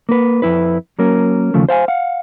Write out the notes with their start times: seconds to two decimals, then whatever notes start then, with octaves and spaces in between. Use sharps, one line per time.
0.09 A#3 B4
0.42 F2 E4 B4
0.99 F#3 A#3 C#4 A#4
1.54 D#2 C#3 F3 A3
1.69 C5 F5 G5 G#5
1.88 F5 F#5